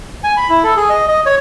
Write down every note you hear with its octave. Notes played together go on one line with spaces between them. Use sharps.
G#5
B5
E4
A4
G#4
D#5
D#5
C#5